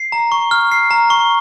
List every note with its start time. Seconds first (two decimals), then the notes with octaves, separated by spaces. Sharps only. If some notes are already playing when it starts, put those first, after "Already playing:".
Already playing: C7
0.12 A#5
0.32 C#6
0.51 F6
0.72 C7
0.91 A#5
1.10 C#6